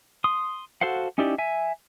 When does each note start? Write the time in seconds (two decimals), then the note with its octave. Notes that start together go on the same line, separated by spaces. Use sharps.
0.24 C6 D#6
0.81 F#4 A4 C5 F5 F#5
1.18 C#4 D#4 E4 G4 D5
1.38 E5 G#5